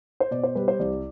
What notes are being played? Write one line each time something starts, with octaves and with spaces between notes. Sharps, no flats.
C5
B2 D5
C5
G3 B4
C5
C2 D5